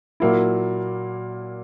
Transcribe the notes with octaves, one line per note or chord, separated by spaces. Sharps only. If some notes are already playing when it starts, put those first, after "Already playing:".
A#2 F#3 A#3 E4